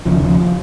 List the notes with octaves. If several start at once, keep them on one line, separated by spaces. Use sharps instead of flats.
F1 D#2 C#3 F3
D#3
F3